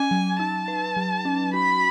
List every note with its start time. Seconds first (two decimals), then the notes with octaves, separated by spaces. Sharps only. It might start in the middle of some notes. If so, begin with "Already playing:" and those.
Already playing: C#4 G#5
0.11 F#3
0.40 D#4 A5
0.68 B4
0.97 F#3
1.25 C#4
1.53 F#4 B5